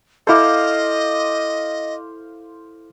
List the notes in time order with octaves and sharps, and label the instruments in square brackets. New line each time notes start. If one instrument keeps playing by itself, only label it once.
[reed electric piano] E4 A4 [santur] C5 F5 D6 [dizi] D#5